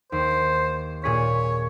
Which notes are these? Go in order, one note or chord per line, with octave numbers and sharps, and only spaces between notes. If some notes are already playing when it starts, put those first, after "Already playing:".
D#2 C5
A#2 G#4 C#5 B6